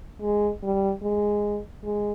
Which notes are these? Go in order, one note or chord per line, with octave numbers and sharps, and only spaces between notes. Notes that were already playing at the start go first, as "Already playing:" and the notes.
G#3
G3
G#3
G#3